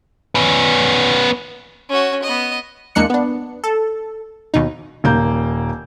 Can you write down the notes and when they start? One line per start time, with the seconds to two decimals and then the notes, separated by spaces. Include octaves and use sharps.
0.35 B3 C#4
1.89 C#4 F#4
2.22 B3 D#5
2.95 E2 G#3 A#3 D4 F#6 C#7
3.10 B3 D4
3.64 A4
4.54 D#2 B2 D#4
5.04 D#1 A#3 G6